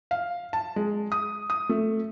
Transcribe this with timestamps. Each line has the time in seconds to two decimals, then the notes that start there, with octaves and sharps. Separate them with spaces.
0.11 F5
0.53 A5
0.76 G#3
1.12 D#6
1.50 D#6
1.69 A3